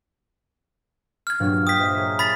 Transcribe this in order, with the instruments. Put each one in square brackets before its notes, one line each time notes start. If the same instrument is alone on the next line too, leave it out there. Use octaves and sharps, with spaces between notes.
[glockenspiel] F6 G#6
[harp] G2 A#2 F#3
[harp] G5 G6 [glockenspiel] D#6 B6
[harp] C5 D#5 E5
G#4 C#5 A#5
[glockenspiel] B5 A6 B6